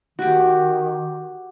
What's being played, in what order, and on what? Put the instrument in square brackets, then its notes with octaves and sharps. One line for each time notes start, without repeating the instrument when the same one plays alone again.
[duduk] D#3 [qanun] F#4 G4